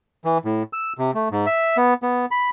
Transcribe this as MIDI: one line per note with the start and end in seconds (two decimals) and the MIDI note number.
0.25 0.38 52
0.45 0.63 45
0.73 0.93 88
0.98 1.11 48
1.14 1.29 57
1.32 1.46 44
1.46 1.77 76
1.77 1.94 59
2.03 2.26 59
2.31 2.50 83